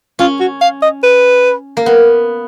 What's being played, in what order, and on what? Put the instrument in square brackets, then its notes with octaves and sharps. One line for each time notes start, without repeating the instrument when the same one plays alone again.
[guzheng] C#4 [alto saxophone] F4
[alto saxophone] F#4
F5
D#5
B4
[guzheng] A#3
B3